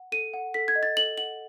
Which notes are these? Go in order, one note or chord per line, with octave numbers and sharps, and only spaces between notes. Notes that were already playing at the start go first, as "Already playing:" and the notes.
Already playing: F#5
A4 D#7
F#5
A4 B6
G#6
D#5
A6
A4 F#7
F#5 F#7